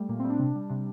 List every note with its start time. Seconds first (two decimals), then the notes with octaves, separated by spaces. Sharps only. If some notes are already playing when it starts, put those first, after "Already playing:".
Already playing: G3 A3
0.09 A#2 A#3
0.19 C4
0.24 G3
0.30 D4
0.39 C3
0.55 G3
0.70 C3 D4